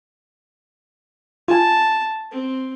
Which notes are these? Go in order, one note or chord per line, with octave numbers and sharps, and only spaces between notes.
F4 G#5 A5
C4